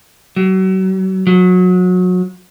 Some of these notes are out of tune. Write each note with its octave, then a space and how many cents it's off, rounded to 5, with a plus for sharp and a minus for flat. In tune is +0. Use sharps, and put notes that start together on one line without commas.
F#3 +35
F#3 -25